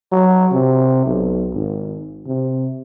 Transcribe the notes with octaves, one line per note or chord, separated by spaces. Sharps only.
F#3
C3
B1
G#1
C3